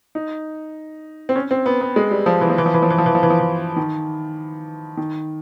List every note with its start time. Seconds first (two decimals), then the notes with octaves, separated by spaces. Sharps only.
0.15 D#4
1.29 C4
1.36 C#4
1.51 C4
1.66 B3
1.81 B3
1.96 G#3
2.11 G3
2.26 F3
2.41 E3
2.50 F3
2.58 E3
2.66 F3
2.74 E3
2.82 F3
2.90 E3
2.98 F3
3.06 E3
3.15 F3
3.23 E3
3.30 F3
3.39 E3
3.76 D#3
4.97 D#3